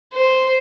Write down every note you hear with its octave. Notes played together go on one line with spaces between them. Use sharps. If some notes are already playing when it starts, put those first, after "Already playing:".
C5